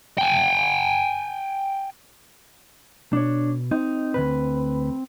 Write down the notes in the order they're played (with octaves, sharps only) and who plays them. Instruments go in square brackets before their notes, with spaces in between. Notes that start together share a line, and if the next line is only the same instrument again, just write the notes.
[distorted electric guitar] G5 G#5
[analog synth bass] B2 [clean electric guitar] D4 C#5
[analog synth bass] C4 [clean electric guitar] D#4
[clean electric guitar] D2 G2 B4